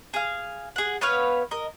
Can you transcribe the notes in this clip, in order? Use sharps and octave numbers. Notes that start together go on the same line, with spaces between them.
G#4 F5
G#4 F#5
B3 B4 C#5 F5
A#4 D#5